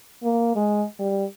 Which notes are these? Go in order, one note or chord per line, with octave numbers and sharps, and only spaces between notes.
A#3
G#3
G3